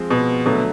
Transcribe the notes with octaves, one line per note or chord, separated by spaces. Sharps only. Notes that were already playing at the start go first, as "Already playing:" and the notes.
Already playing: F3 G#3 C4
B2
B2 D3 F#3 A3